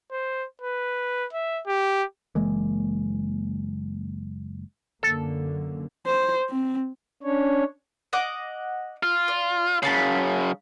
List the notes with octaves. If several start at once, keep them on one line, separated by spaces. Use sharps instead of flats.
C5
B4
E5
G4
F#1 E3 G#3 A#3
F#2 D3 A#3 A4
C5
C4
C#4 D4 C#5
D#5 F#5 D6
F4
D5
F#2 C#3 F5 A5 B5